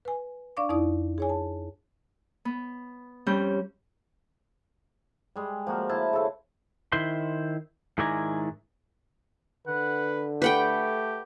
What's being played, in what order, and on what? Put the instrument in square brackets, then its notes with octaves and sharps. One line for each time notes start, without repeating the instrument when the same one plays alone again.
[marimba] B4 G#5
D4 D5 F5 C#6 D6
F2 D#4 E4 D5 D#6
G#4 C#5 G#5
A5
[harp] B3
F2 G3 C4 C#4 G6
[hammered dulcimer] G3 G#3
F3 A#3 F#4
E4 C5 A5
C#3 A4
[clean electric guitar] D#3 E4 C5 C6
G#2 D#3 E4 D5 G#5 A#5
[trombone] D3 [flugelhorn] B4 [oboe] F#5
[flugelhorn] A3 [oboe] G4 [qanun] B4 F#5 G5